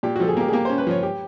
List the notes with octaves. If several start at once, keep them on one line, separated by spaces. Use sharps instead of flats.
A#2 G4
F#4
F3 A4
G#4
A#3 G4
G#4
A#3 G4
C5
C#4
B4
F3 C#5
G4